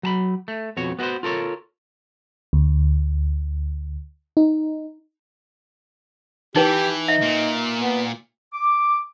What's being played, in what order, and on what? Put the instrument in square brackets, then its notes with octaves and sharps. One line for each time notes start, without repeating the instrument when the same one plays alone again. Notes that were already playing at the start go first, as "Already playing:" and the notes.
[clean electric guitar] F#3 A5 B5
A3
F2 B2 F#4 C#5
B3 F#4 G#4 B4 C5
F4 A4 A#4 C#5
[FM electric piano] D2
D#4
[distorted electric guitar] E3 [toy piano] D#4 B4 [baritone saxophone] G4
[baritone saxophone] D#4 [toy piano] E5
[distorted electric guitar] A#2
[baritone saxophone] B3
[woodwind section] D6